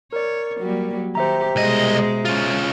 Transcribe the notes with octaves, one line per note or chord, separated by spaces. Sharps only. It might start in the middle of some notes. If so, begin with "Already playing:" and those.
A#4 C#5 D5
F#3 G3 A#3
D#3 G4 C5 E5 A#5
C2 B2 G#3 D#5
C#4 F4